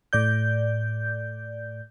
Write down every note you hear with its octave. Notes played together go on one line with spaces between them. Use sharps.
A2 D5 G6